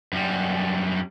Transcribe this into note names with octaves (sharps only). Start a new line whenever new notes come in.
F#2 G3